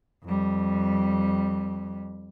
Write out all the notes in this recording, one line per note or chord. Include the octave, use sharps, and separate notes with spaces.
F2 G3